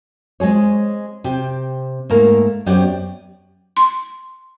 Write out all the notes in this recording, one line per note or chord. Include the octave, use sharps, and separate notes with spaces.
G#3 C4 G#4 C#5
C3 C4 G4
G#2 A3 A#3 A#4
F#2 B3 C4 G4 C#5 D5
C6